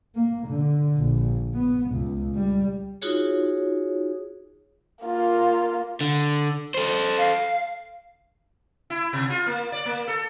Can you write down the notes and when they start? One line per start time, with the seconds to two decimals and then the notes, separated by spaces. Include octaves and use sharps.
0.15 A#3
0.47 D3
0.96 A#1
1.54 B3
1.90 C#2
2.35 G3
3.02 D#4 F4 F#4 G#4 C#5
5.03 A#3 F4
6.01 D3
6.74 A4 C5
7.18 F5
8.90 E4
9.13 C3
9.30 F4
9.46 A#3
9.72 D5
9.86 A#3
10.08 A4